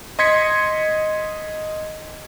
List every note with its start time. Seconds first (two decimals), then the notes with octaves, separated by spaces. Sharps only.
0.19 D#5 C6 G#6 B6 C#7